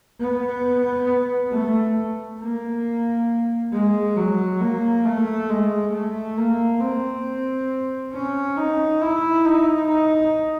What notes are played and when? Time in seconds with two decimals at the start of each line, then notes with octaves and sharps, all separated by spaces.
0.20 B3
1.52 A3
2.40 A#3
3.73 G#3
4.16 F#3
4.61 A#3
5.05 A3
5.49 G#3
5.93 A3
6.37 A#3
6.81 C4
8.13 C#4
8.57 D#4
9.02 E4
9.45 D#4
9.89 D#4